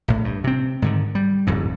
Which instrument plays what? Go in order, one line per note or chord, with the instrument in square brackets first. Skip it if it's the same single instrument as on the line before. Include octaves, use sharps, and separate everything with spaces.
[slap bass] A#1 A2
G2
C3 C4
G#2 D3 D#3
G3
D1 F2 G#2